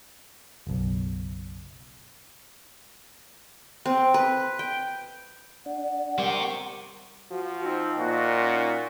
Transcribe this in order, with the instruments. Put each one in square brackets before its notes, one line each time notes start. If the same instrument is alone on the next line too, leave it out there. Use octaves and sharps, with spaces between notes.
[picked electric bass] F#1 B1
[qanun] C4
B4
G5
[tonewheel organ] D4 [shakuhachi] F#5
[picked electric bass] G3 [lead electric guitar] C4 G4 [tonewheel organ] A#4 C#6
[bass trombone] F3 [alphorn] F#4
[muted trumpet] C4 [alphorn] D#4
[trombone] A#2 [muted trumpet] F#4
[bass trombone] C#4